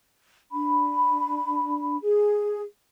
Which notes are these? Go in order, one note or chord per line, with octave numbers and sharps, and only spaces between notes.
D4 B5
G#4